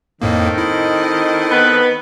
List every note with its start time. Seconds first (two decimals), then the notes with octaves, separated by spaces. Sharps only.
0.22 F2 A2 D#3 A#3 C4 A4 D#5
0.58 E4
1.51 B3 B4